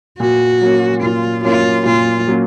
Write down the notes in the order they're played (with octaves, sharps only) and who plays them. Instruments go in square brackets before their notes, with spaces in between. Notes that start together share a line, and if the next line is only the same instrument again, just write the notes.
[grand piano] A#2 [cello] F#4
[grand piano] F#3 A#3 C#4
[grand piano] A#2 [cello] F4
[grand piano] F#3 A#3 C#4 [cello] F4
[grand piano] A#2 [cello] F4
[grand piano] F#3 A#3 C#4